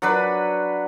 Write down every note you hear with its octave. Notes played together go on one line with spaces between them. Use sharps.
F#3 D4 B4 B5